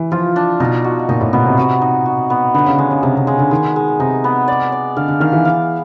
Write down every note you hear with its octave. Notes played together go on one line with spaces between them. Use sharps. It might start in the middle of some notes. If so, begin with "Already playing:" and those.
Already playing: E3
F3 F4
D4
B2 D#4
F#4
A#2 D#4
A2
B2 B3
C3
C3 F#4
D#4
F#4
B3
D3 B3
C#3
D3 G#3
C#3
C3 G#3
C3
C#3 G#3
D3
D#3 G#3
G#3
C3 D#4
B3
D5
D5
D3 F5
D3
D#3 F5
E3
F5